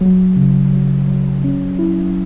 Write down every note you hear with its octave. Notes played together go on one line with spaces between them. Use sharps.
F#3
C#3
F#3
F#3
C#4
E4